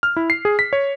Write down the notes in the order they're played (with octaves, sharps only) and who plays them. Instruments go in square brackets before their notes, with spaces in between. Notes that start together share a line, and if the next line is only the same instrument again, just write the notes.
[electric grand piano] F6
E4
C7
G#4
B6
C#5